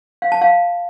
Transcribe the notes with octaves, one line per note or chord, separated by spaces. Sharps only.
F5
A5
F5